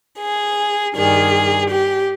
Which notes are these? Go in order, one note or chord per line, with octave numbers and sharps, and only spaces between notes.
G#4
G2 D#3 G3 G#4
G4